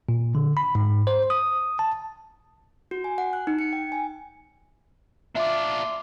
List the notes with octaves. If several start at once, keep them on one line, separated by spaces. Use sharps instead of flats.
A#2
D3
B5
G#2
C5
D#6
A5
F#4
G#5
F#5
F#6
D#4
C#7
G5
G#5
D4 F4 E5 D6